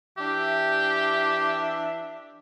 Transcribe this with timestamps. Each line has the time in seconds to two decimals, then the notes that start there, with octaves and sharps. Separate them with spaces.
0.17 E3 D4 G4 E5